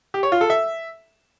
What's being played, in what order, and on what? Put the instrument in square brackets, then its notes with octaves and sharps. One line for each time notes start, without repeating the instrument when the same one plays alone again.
[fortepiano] G4
C#5
F4
A4
E5